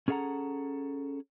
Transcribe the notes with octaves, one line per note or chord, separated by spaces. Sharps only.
C#4 G#4 A4 F5 F#5 A#5